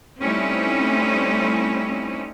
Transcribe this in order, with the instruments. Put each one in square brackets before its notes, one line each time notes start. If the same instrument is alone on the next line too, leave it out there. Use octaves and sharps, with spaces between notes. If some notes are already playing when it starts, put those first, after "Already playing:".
[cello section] G3 A3 C4 C#4 D#4 E4